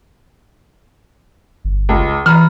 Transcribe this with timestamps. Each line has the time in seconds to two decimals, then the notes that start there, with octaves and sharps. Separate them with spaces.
1.65 G1
1.89 C#2
2.26 E3 A#5 B5 F6